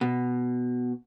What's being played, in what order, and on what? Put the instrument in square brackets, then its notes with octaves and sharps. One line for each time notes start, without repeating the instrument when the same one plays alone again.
[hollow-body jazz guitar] B2